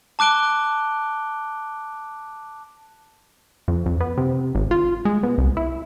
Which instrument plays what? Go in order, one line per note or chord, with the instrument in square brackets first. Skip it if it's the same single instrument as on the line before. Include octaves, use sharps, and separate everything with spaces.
[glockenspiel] A5 D6 F#6 D7 G7
[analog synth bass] F2
F2
B3
C3
G#1
F4
G#3
B2
C2
E4